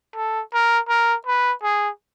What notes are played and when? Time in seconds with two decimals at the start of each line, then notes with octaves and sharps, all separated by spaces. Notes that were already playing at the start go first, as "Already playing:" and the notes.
0.15 A4
0.53 A#4
0.89 A#4
1.27 B4
1.63 G#4